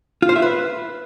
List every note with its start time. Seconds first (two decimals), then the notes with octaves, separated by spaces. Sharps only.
0.22 F4
0.29 C5
0.36 E5
0.42 B4